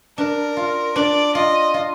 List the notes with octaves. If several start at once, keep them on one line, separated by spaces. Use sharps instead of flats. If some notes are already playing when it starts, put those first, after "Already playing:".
D4 A#4
F4
D4 D5
F4 D#5
F4